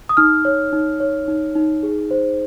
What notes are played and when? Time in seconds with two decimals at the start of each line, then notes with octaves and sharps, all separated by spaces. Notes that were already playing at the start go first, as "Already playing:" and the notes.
0.09 D#6
0.17 D#4 F6
0.45 C#5
0.73 D#4
1.00 C#5
1.28 D#4
1.55 D#4
1.83 G#4
2.11 C5